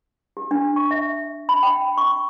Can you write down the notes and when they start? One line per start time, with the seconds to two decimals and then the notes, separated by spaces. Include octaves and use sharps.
0.37 G4
0.51 D4
0.76 C#6
0.91 E5
1.49 B5
1.63 G5
1.97 C#6